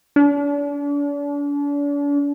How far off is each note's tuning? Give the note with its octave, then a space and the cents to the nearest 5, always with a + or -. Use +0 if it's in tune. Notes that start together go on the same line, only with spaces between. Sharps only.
D4 -40